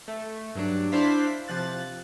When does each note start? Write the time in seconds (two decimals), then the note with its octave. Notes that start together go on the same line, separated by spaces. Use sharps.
0.08 A3
0.55 G2 F#3 D4
0.92 D4 E4 C5 F5 B6
1.48 C3 F3 F#6 A6